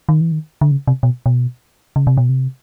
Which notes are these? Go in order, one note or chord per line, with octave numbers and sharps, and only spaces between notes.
D#3
E3
D#3
D3
C#3
C3
B2
B2
C#3
C3
B2
C3